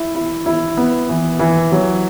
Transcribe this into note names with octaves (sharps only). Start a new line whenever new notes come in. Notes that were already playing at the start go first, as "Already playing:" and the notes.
Already playing: E4
E4
E4
B3
E3
E3
F#3